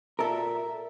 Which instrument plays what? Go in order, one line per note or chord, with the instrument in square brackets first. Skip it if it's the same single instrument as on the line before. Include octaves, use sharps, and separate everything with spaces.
[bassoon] A#2 [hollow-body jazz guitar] A4 A#4 [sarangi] E5